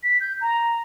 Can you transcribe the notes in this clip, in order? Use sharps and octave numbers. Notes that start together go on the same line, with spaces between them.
B6
G6
A#5